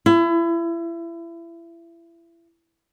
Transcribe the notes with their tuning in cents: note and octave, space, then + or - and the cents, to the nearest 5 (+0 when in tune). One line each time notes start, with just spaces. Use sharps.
E4 +30